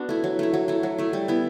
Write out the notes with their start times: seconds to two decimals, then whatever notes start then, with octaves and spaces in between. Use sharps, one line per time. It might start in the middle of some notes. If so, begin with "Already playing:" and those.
Already playing: B3 D4 F#4
0.09 A3 E4
0.24 F#3
0.39 A3 E4
0.54 F#3
0.68 A3 E4
0.83 F#3
0.98 A3 E4
1.13 G3
1.28 B3 E4